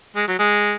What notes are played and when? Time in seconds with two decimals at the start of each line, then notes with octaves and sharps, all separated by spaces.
0.16 G#3
0.28 F#3
0.39 G#3